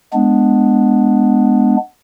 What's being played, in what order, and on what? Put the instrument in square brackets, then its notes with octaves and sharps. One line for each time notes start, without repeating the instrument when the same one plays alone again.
[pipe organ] G#3 B3 D4